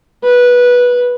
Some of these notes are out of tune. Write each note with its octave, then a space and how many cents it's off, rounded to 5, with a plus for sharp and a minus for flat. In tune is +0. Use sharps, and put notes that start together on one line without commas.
B4 -15